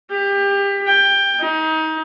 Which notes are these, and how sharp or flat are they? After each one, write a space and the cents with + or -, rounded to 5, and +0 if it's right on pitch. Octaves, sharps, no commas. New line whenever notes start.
G4 +25
G5 +15
D#4 +25